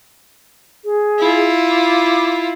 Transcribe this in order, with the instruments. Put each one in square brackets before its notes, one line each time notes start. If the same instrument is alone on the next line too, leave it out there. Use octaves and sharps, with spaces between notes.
[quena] G#4
[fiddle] E4 F4
[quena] D6